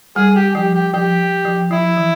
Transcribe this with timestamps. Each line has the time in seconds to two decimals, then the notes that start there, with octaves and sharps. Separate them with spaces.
0.16 G3 G#4
0.36 G4
0.55 F3 G4
0.74 G4
0.93 F3 G4
1.45 F3
1.71 F3 E4
1.97 E3